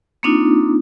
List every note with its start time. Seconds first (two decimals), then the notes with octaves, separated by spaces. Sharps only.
0.23 A#3 C4 D4 D#4 F4